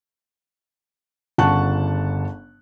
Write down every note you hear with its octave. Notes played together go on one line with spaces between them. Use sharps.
G1 C#3 F#5 A5 C#6 F#6